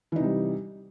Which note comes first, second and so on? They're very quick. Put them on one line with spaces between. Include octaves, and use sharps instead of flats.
E3 D#4 C3 G3